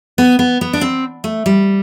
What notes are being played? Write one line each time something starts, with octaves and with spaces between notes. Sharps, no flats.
B3
B3
B3
D4
C4
A3
G3